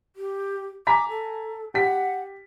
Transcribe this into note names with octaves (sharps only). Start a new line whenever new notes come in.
G4
G#5 A#5 D6 B6
A4
G4 F#5 B6